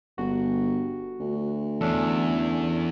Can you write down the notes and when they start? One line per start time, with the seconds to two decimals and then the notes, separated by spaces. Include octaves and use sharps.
0.18 G1 F#4
1.20 D2
1.81 E2 C#4 D4 A4